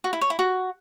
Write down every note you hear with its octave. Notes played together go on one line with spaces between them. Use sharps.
F#4
E4
C#5
E4
F#4